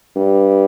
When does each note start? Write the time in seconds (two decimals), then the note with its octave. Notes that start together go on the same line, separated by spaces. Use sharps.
0.17 G2